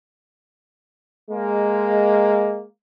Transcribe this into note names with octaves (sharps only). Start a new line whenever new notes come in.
G#3 A#3